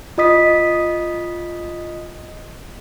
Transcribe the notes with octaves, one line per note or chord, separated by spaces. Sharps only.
F4 D#5 D#6 B6